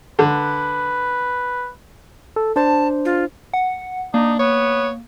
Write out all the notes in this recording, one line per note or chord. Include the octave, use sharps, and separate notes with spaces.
D3 B4
A4
D4 C5 A5
F4
F#5
A#3 D4 D#4
B3 C#5